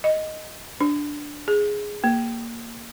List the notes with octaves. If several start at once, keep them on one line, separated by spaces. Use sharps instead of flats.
D#5
D4
G#4
A#3